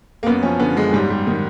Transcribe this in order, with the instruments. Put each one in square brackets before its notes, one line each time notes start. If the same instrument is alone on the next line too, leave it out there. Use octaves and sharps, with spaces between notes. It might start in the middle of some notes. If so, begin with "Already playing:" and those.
[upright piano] A#3
F#2 B3
F3 C#4
D3 B3
F#2 G#3
G#2 G3
G3
D#3